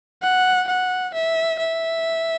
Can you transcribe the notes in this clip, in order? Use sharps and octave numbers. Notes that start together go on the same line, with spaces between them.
F#5
F#5
E5
E5